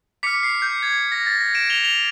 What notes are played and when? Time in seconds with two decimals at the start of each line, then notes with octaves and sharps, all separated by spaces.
0.23 D6 F6 B6 C#7
0.43 C7
0.62 G6
0.82 G#6
1.12 A#6
1.26 A6
1.41 A#6
1.55 D7 E7
1.70 F7 G7
1.84 F7 G7